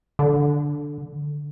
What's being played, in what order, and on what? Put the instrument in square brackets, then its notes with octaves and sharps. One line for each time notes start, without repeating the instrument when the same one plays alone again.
[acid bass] D3